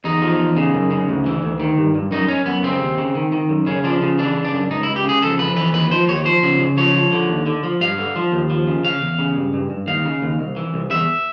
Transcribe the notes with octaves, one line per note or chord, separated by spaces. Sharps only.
E2 D#4
F3
E2
C#3
F#2
C#3
D2
E3
D2
D#3
G2
G2
F#2 D#4
F#2 C#4
F#2 B3
C#3 C4
D#2
C#3
D#3
D#3
F#2
C#3 C#4
F3 D4
C#3
E3 D4
C#3
D4
F#2
C#2 D#4
E4
C#2
G4
C#3 G#4
F2 A4
F2 B4
E3 B4
D#2 B4
F3 C5
D#2 C#5
F3 C5
C#3
C#3
F3 C#5
F3
D3
D#2
D3
F3
G2 F5
D3
F3
D#2
F3
C#3
C#3 F5
E2
C#3
G2
G2
G2
D#2 F5
C#3
D#2
C2
E3
C2
E2 E5